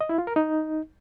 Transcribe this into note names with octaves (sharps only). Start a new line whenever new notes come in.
D#5
E4
F4
A#4
D#4